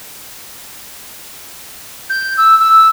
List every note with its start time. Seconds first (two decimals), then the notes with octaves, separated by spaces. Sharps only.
2.09 G6
2.37 E6
2.59 E6